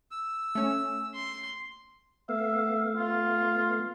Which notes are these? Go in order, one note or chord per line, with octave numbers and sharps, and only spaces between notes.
E6
A3 C#4
C6
A3 B3 E5 F5
F4